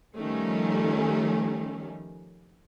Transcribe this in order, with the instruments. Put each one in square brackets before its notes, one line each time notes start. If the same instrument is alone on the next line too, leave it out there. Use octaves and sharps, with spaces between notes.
[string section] D#3 F3 G3 A3 C#4